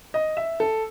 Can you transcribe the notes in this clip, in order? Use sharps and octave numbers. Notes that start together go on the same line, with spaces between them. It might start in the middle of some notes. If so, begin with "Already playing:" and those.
D#5
E5
A4